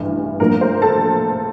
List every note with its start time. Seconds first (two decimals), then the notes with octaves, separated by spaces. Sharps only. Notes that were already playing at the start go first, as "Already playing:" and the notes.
Already playing: A1 G2 E3
0.40 A2 F3 A#3 D4 A#4
0.61 C5
0.82 A4 A5